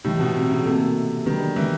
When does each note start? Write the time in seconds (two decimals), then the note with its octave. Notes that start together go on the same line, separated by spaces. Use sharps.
0.04 A2 E3 G3 B3 D#4 G4
0.20 B2
0.35 C3
0.50 C#3
0.65 C3 A#3 D#4 F#4 A4
1.26 D#3 F#3 B3 D4 G4 B4
1.56 E3